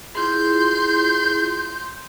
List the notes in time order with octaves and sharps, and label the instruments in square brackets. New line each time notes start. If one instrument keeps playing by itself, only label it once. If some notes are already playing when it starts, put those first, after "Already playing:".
[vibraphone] E4 F4 G#4 [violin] C6 G6